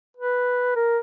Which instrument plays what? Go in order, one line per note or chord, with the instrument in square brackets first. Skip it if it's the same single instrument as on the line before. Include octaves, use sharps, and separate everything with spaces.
[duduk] B4
A#4